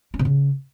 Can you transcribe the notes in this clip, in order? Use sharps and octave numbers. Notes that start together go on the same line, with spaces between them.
C#4
C3
C#3